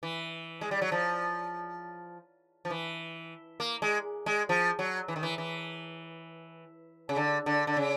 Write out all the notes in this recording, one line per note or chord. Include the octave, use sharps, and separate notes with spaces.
E3
G#3
G3
F#3
F3
F3
E3
A#3
G#3
G#3
F3
F#3
E3
D#3
E3
E3
C#3
D3
D3
D3
C#3